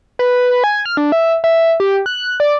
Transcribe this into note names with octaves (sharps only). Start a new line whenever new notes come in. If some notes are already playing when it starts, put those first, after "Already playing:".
B4
G#5
F6
D4
E5
E5
G4
F#6
D5